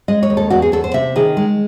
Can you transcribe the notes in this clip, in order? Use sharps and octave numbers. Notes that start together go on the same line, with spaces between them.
G#3 D#5
C#5
D#2
A4
E2 F#4
G#4
E2 A4
C5
C3 E5
D#3 G#4
G#3